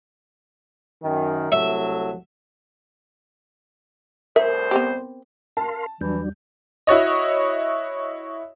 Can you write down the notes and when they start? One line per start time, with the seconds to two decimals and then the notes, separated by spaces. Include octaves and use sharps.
1.03 F#2 D#3
1.52 C2 F#3 A3 E5
4.36 C2 A2 A#4 C5 E5
4.71 B3 C4 G4
5.57 A#4 F5 A5 C6
6.01 E2 E3 F#3 G3 D4 G6
6.87 E4 F#4 C#5 D#5